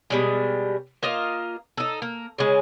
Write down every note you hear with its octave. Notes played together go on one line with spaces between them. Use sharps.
B2 G3 G#3
A#3 F4 D#5 F5
D#4 A4
A#3
C#3 G#3